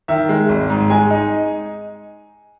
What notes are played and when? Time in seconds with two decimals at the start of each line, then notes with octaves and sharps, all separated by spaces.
0.08 D#3 E5
0.29 G#3
0.49 G#1
0.70 G#2
0.90 G#3 G#5
1.10 D#4